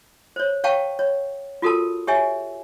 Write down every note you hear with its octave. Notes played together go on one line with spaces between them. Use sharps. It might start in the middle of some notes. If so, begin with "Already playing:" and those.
C5 C#5
C#5 F5 G5 A5 C#6
C#5
F4 F#4 A4 A#4 A5
G4 C#5 E5 G#5